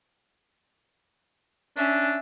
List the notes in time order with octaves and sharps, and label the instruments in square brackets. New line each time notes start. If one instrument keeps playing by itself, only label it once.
[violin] C#4 E5 [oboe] D4